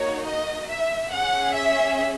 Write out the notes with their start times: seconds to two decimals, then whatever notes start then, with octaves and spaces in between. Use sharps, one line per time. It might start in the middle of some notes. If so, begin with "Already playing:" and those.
Already playing: A#3 D#4 F#4 C#5
0.24 D#5
0.67 E5
1.09 C#4 G#4 F#5
1.52 E5